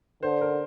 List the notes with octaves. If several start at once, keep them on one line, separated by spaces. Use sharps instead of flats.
D3 C5
A#4